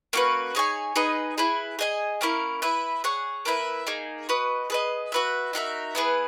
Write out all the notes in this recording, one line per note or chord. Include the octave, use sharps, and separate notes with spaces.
A#3 C#4 F#4 B4
D#4 G#4 C#5 G#5
D#4 G#4 B4 D#5
E4 G#4 B4
G#4 D#5 G#5
A#3 C#4 E4 A#4
E4 B4 E5
G#4 C#5 F#5
A#3 E4 B4 E5
A#3 D#4 G#4
F#4 B4 D#5
G#4 B4 D#5
F#4 B4 E5
D#4 F#4 A#4 E5
B3 E4 G#4 B4